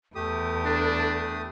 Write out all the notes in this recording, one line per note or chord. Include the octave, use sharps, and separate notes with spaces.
E2 A3 G4 A4 D#6
D4